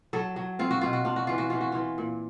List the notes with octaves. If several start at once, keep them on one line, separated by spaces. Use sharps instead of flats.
F#3 A4
F#3
C4 F4
F#4
B2 F4
F#4
D4 F4
F#4
E3 F4
F#4
E3 F4
F#4
E3 F4
A#2